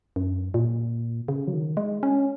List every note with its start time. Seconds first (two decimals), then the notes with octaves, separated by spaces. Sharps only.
0.16 F#2
0.54 A#2
1.28 C#3
1.47 F#3
1.53 D#3
1.77 G#3
2.03 C#4